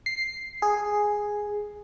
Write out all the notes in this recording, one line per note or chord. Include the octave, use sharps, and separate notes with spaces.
C7
G#4